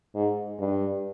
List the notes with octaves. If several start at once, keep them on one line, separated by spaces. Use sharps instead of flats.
G#2
G2